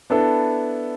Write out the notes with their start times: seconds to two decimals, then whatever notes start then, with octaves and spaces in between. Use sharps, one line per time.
0.10 B3 D4 E4 A4